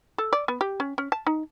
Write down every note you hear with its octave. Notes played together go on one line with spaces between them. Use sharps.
A4
D5
B3
G4
C#4
C#4
A5
D#4